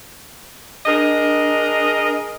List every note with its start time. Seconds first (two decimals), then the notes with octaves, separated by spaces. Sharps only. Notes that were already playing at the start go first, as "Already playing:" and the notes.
0.86 D4 G#4 A#4 D#5